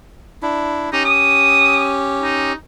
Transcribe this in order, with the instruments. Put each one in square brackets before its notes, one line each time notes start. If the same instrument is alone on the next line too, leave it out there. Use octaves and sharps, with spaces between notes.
[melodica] D4 E4
[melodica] C#4 G4 [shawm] D#4
[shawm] D#6
D#4